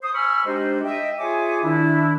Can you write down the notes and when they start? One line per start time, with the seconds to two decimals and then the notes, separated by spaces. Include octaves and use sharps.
0.02 C5 D#6
0.15 G#5 B5 C#6 E6 F6
0.45 G#3 D4 D#4 G4 C5 D#5
0.84 D#5 E5 G5
1.18 F4 G#4 C#5 E5 G#5 D6
1.63 D#3 D4 E4